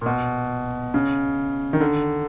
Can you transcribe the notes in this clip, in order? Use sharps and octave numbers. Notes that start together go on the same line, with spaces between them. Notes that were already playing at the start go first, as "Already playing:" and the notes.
A#2
B2
C#3
D#3
D3